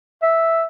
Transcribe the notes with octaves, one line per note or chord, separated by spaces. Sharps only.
E5